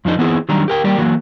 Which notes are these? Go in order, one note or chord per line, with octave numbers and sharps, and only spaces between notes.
F2 F3 D4 D#4
E3 B3 C4 D#4 E4 G#4
D#3 F#3 G3 D4 A#5
G4 A#4 G5
G3 A#3 G4 D5
E3 F#3 A#3 F#4